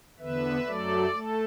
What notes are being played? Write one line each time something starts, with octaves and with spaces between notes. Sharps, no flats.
E2 D3 B3 B4 E5
F#2 F#3 A3 A4 D5
A3 A4